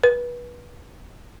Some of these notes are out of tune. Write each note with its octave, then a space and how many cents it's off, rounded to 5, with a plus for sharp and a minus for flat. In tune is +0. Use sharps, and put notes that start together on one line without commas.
B4 -25